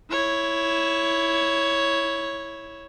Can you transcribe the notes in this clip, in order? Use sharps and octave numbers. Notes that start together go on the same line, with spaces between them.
E4 C#5